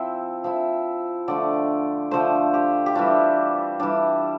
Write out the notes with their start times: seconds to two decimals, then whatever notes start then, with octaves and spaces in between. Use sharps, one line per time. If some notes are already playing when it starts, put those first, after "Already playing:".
Already playing: F3 C4 E4 C5
0.44 F3 C4 E4
1.28 D3 F3 A3 D5
2.11 D3 F3 A3 C5
2.54 G4
2.86 G4
2.95 E3 G3 D4 F4
3.80 E3 G3 D4